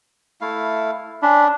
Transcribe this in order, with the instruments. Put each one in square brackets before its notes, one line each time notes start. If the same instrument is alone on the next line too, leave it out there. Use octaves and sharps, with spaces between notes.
[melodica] A3 E4 F5
[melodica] C#4 B5 [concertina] D4